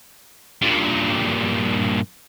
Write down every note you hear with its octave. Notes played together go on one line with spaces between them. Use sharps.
G2 A#2